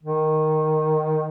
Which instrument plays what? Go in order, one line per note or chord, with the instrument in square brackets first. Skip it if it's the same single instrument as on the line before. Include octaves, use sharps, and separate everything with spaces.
[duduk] D#3